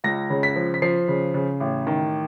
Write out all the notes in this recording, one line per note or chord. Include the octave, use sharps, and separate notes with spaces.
C#2 A#6
C#3
B6
F3
B6
F3 C7
C#3
C#3
A1
D#3